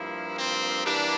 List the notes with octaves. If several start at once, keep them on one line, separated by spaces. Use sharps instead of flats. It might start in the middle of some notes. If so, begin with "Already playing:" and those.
Already playing: G2 F3 A#3 E4
C4
E3 G3 A#3 D4